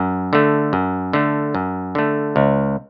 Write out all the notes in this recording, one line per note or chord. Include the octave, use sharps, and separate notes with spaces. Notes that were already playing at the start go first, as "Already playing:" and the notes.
Already playing: F#2
D3 A3
F#2
D3 A3
F#2
D3 A3
C#2